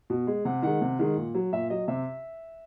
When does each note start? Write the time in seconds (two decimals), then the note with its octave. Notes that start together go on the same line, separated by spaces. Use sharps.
0.10 B2
0.27 G#3
0.45 C3 F#5
0.62 D#3 G#3 F#5
0.81 C3
0.99 D#3 G#3
1.17 A#2
1.35 F#3
1.53 A#2 E5
1.70 F#3 D#5
1.88 C3 E5